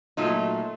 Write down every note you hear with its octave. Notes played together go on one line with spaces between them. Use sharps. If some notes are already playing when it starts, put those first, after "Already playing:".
A#2 F#3 A3 D#4 F4